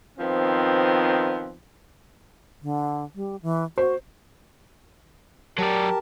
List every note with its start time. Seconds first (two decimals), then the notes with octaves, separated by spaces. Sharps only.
0.18 D#3 F3 B3 C4
2.62 D3
3.15 G3
3.42 E3
3.78 F#4 C5
5.59 F#3 G4 A#4 D5 A5